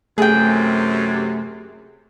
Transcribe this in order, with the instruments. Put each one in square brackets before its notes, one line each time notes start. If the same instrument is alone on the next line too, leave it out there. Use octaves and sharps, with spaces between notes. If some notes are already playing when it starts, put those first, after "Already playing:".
[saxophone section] F#2 C3 [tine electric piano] A3 [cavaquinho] G#4 G5